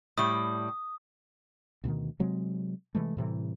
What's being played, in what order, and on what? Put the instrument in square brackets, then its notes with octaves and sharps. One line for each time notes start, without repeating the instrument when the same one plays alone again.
[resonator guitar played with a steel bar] A2 G3 [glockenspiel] D#6
[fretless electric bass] D2 B2 D3 D#3
C3 F#3 G#3 C4
C3 E3 G#3 A3
A2 C3 E3 G3